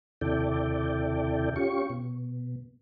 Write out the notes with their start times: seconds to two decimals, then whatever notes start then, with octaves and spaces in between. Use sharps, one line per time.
0.21 D#2 C3 E4 A4 D5 G5
1.56 C#4 F4 G4 C#6
1.90 B2